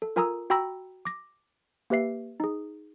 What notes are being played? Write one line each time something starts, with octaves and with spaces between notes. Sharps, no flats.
A4
F4 A#4 G#5 A#5 D#6 E6
F#4 G5 A#5 B5 E6 A#6
D6 A#6
A#3 G4 B4 E5 C7
D#4 G#4